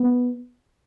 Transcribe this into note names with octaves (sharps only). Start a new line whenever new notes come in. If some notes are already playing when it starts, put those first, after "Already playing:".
Already playing: B3